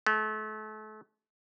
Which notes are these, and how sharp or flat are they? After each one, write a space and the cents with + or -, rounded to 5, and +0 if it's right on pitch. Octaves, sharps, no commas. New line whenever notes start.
A3 -35